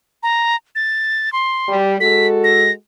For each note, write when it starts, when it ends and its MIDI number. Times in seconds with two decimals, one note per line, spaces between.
0.23 0.56 82
0.75 1.32 93
1.33 1.77 84
1.69 1.95 55
2.00 2.71 56
2.00 2.71 66
2.00 2.71 69
2.00 2.27 95
2.44 2.71 94